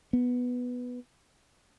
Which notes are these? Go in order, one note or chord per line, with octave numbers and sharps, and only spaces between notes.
B3